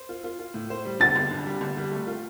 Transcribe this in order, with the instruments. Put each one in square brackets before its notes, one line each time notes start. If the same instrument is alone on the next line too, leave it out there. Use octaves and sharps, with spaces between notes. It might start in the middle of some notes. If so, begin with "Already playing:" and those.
Already playing: [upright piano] C5
F4
F4
F4
A2
C5
G3
[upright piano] G1 [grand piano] A6
[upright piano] G1
G2
G3
G1
G3
A3
F4